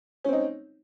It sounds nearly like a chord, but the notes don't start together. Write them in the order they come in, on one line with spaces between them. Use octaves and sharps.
C#4 C4 D#4